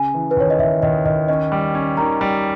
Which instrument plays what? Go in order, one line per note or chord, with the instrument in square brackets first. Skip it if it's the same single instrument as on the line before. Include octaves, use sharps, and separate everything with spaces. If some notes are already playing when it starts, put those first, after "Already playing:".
Already playing: [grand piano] C#3 [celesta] G#5
[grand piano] E3
[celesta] B4
[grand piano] D#2 [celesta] C#5
[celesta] D#5
[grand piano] D#2 [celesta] E5
[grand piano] D#2 [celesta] D#5
[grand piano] D#2 [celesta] D#5
[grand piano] C#4 [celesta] D#5
[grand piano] G3
C#4
[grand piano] D#3 [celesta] A#5
[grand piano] G3